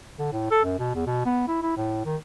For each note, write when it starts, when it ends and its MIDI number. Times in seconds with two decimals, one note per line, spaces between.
0.19 0.28 50
0.32 0.49 45
0.51 0.62 69
0.64 0.76 42
0.79 0.92 47
0.94 1.04 40
1.06 1.24 47
1.25 1.43 59
1.48 1.59 64
1.62 1.77 64
1.77 2.01 45
2.05 2.16 51